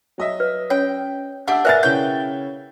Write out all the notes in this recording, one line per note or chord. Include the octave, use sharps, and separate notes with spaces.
F#3 D#5 E5
B4
C#4 C#5 G5
D4 G4 E5 F#5 E6
A#4 B4 D5 E5 G#5 A#5 F#6 A6
C#3 E4 C#5 G5 G6